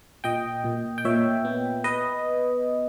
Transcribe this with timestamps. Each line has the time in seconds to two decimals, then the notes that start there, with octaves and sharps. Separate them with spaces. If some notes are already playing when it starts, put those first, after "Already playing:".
0.24 A#2 D#5 G5
0.64 A#2
0.98 G5
1.05 A#2 C#5 E5
1.45 B3
1.84 B4 D#5